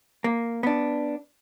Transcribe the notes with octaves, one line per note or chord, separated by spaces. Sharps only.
A#3
B3 D4